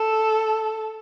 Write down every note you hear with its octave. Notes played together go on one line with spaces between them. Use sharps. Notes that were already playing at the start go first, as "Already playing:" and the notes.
Already playing: A4